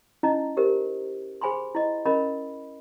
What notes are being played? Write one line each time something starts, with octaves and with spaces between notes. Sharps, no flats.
C#4 D#4 E4 D#5 A#5
G4 A#4 C5
G#4 C5 G#5 B5 C6
E4 D#5
C#4 A#4 D#5 B5